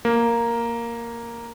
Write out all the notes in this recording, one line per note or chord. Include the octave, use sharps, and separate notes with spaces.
A#3